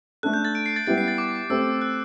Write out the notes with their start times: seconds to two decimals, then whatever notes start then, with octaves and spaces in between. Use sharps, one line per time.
0.23 A3 D4 A4 F#6
0.33 G6
0.45 A6
0.55 D7
0.66 C7
0.76 A6
0.87 G3 B3 E4 G4 A6
0.98 C7
1.08 A6
1.18 D6
1.50 A3 C4 G4 E6
1.82 F#6